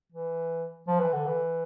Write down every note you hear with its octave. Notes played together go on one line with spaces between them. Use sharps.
E3
F3
E3
D3
E3